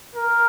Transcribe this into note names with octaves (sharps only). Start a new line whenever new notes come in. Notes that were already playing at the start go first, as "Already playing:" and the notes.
A#4